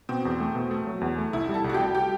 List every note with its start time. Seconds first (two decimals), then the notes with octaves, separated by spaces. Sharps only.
0.09 B2 C4
0.25 E2
0.40 A3
0.55 B2
0.71 A3
0.87 F#3
1.01 E2
1.18 A3
1.33 C2 E4
1.49 G3
1.54 A4
1.64 C2
1.69 F#4
1.74 G4
1.80 G3
1.95 G4